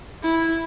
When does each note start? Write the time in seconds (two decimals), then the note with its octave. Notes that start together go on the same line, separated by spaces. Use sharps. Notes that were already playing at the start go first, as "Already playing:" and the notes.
0.23 E4